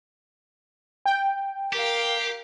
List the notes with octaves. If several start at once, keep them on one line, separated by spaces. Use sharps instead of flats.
G5
G4 A#4 F5